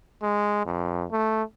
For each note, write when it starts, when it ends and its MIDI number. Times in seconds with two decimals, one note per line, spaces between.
0.23 0.62 56
0.66 1.05 41
1.12 1.43 57